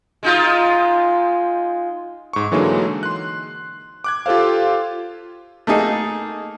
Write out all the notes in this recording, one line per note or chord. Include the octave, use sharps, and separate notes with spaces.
G#3 D#4 F4
G#2 C#6
D3 E3 F#3 G#3 A#3 D#4
C6 F#6
D6 F#6 G#6
F4 G4 A4 C5 F5
A3 A#3 D#4 G#4